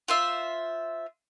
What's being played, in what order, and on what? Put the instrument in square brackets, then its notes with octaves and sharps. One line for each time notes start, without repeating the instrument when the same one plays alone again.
[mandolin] F4 C5 E5